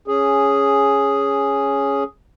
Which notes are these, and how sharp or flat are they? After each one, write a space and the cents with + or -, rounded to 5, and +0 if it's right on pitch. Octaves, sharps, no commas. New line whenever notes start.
C#4 +0 G#4 +0